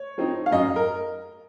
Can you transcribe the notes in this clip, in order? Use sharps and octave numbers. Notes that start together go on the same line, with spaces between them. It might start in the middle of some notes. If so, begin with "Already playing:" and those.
Already playing: C#5
F3 C4 D#4
F5
F#2 D#5
A#4